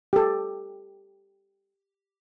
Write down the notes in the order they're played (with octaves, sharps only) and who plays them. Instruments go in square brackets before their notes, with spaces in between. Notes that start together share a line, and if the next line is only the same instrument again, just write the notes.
[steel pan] G4 A4